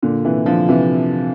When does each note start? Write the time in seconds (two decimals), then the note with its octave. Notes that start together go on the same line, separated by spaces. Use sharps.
0.03 A#2 D3
0.25 C3 E3
0.46 D3 F3
0.69 C3 E3